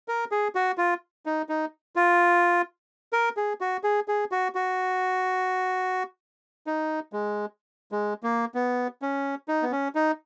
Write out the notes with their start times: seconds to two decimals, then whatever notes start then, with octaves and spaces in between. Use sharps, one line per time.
0.08 A#4
0.31 G#4
0.55 F#4
0.78 F4
1.26 D#4
1.49 D#4
1.96 F4
3.13 A#4
3.37 G#4
3.61 F#4
3.84 G#4
4.08 G#4
4.32 F#4
4.55 F#4
6.67 D#4
7.13 G#3
7.92 G#3
8.23 A#3
8.55 B3
9.02 C#4
9.48 D#4
9.62 B3
9.72 C#4
9.95 D#4